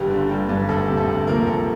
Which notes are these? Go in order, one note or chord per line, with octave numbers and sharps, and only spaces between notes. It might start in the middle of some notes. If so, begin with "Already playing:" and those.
Already playing: G1 G2 G3 G4
D3
G3
G2
D2 A4
C3
A4
D2
F3 A#3 A#4
D2 A4